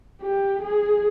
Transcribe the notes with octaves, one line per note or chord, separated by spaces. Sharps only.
G4
G#4